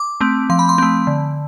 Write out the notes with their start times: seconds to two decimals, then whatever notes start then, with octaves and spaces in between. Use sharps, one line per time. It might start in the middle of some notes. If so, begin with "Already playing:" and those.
Already playing: D6
0.21 A3 C4
0.50 F3 C6
0.59 B5
0.69 C6
0.78 A3 C4
1.07 D3